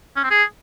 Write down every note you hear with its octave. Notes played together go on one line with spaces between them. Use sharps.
C#4
C4
G#4